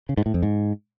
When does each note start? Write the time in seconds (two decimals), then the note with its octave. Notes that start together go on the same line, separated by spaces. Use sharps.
0.09 C#3
0.17 G#2
0.26 A2
0.34 F2
0.43 G#2